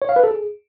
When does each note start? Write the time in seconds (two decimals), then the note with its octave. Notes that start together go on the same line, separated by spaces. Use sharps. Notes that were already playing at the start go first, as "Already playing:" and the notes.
0.02 C#5
0.09 F5
0.16 B4
0.24 A4
0.31 G#4